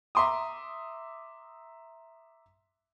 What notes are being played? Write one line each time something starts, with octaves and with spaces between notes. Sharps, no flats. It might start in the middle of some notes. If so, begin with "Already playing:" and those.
E5 A#5 C6 D6 D#6